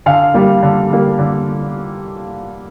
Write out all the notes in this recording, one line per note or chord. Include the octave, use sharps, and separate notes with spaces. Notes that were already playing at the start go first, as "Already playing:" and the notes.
D3 F5
G3 A#3
D3
G3 A#3
D3